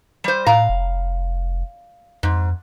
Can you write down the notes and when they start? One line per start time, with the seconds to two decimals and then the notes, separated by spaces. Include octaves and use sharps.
0.24 G3 C5
0.46 A2 F5 A#5
0.69 F1
2.23 F2 G#2